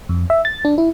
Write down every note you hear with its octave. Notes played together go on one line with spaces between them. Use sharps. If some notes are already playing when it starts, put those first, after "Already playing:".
F2
E5
A6
D4
E4